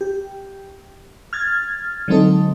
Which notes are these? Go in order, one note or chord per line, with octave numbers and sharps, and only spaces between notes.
G4
F6 G#6 A6
D3 F#3 G#3 C4 D#4 A4